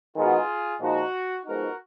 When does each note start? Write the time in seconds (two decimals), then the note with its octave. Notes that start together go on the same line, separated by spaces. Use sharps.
0.15 D#3 G#3 B3 D#4 F4 F#4 G#4
0.80 A#2 F3 G#3 D#4 F#4
1.45 F3 G#3 B3 D#4 F#4 A#4